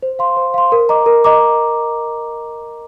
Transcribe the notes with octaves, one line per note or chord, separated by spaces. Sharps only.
C5
F5 C6
C5
F5 C6
A#4
D#5 A#5 D6
A#4
D#5 A#5 D6